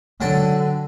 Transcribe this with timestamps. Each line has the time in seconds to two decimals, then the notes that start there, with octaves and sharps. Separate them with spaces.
0.21 D3 F#3 G5 A5